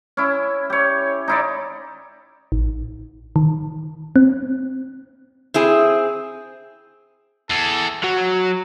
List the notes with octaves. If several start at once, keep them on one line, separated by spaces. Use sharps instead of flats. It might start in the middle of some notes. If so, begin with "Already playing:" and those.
C#4 E4
G4 C#5
D#4 E4 D5
A1
D#3
C4
C4 E4 G#4
E2 A4
F#3